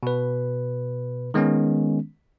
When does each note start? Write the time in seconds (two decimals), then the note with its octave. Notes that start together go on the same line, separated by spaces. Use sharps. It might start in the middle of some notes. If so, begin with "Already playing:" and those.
0.03 B2 B4
1.34 D#3 G#3 B3 C#4